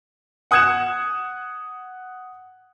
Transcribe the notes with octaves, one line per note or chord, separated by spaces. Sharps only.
F#5 D#6 F#6 G#6 C#7 E7